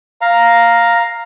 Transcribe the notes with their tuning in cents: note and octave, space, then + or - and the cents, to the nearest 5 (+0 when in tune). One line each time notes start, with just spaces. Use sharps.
F5 +0 A#5 +0